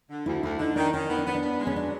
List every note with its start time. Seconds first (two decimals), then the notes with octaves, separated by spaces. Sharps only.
0.10 D3
0.26 D2 E4
0.43 D2 E4
0.59 D3 D#4
0.76 D#3 D4
0.93 D#3 C#4
1.10 B3 D#4
1.18 D4
1.26 B3 C#4
1.35 D4
1.42 B3
1.59 G#3
1.67 C#4
1.76 F#3 D4